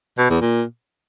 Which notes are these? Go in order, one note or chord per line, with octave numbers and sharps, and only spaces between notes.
B2
E2
A#2